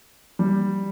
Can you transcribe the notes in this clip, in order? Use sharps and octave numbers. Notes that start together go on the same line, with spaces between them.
G3